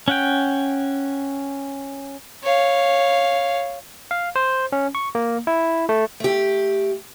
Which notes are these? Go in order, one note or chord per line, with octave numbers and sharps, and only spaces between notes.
C#4 F#5 G5
C#5 F5
F5
C5
C#4
C#6
A#3
E4
A3
A3 G4